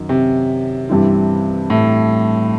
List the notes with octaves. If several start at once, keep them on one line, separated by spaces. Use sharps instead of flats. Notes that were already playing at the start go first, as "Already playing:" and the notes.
Already playing: F#2 D#3 D#4
C3
G2 E3 G3 C4 E4
A2